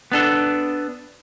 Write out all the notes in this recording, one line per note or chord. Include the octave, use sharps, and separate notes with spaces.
B3 D4 A4